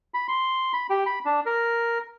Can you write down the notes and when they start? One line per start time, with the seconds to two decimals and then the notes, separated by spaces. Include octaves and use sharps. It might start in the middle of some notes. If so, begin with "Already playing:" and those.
0.14 B5
0.28 C6
0.73 B5
0.90 G4
1.06 B5
1.25 D4
1.46 A#4